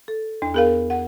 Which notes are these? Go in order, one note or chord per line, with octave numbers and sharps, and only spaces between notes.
A4
E2 D4
B3 G#4 A#4 F5
F#5